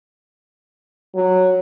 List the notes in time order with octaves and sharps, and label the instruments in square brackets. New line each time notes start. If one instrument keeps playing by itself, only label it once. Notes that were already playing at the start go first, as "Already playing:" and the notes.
[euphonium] F#3